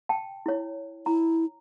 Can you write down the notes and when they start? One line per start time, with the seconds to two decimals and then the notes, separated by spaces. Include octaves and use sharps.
0.09 G5 A5
0.46 E4 C#5
1.06 E4 A#5